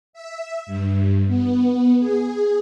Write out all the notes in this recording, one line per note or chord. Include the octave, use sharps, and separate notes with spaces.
E5
G2
B3
G#4